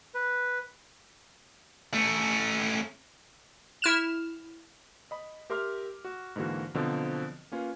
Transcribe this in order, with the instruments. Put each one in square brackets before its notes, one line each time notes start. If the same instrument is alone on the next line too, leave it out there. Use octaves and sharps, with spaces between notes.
[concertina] B4
[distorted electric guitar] A3 C#4
[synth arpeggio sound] E4 F6 E7
[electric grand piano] D#5 B5
G4 A#4 E5 C6 D6 F6
F#4
G#2 D3 E3 A#3 F#4
B2 D3 F3 F#3 C4
A#3 C#4 F4 B4